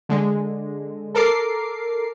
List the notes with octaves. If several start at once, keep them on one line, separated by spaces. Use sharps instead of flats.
D3 G#3
A4 A#4 D6 C7